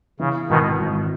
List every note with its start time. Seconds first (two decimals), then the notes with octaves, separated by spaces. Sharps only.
0.19 C#3 E3
0.49 G#1 B2 D#3
0.79 G#1